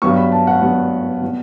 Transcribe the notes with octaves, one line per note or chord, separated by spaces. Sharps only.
G2 F#3 B3 C#6
B5
A5
F#5
G2 F#3 B3
B2 G3 B3